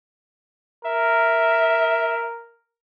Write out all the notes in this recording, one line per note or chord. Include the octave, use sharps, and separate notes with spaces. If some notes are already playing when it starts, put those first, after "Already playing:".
A#4 E5